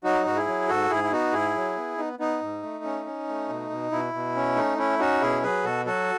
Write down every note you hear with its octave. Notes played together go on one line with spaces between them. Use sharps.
F#3 D#4 F#4
G#2 F#4
E4 G#4
F#3
G#2 F#4 A4
G#2 E4 G#4
E4
B3 D#4 F#4
G#2 E4 G#4
F#3
B3
B3 D#4
B3 D#4
G#2
A3
C#4
C#4
A3
B2
B2
B2 E4
B2
C#4
A3 D#4
C#4 E4
C#4 D#4 F#4
B2 E4 G#4
F#3 G#4 B4
B2 F#4 A4
F#3 F#4 A4